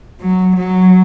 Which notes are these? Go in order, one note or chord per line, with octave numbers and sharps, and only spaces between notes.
F#3
F#3